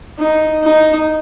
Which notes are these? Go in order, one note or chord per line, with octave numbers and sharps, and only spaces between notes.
D#4
D#4